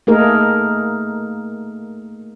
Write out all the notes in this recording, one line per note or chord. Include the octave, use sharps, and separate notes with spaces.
A3 A#3 D#4 G#4 A#4